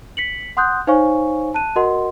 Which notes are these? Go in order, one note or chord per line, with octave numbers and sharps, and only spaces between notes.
B6 C#7 F#7
F#5 C6 D#6 F#6 G6
D#4 C5 C#5 F5 G#5 C#6
A5 F#6 D#7
F#4 A#4 D#5 F#5 C6